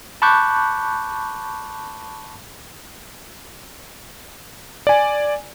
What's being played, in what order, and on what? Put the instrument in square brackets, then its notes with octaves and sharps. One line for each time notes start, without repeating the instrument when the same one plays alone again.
[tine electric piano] A5 B5 C#6 D6 F#6 G6
[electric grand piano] D5 G#5